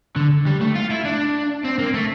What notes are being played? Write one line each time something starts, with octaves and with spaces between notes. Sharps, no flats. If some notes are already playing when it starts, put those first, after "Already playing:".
D3
G3
A3
F4
E4
D4
C4
A#3
A3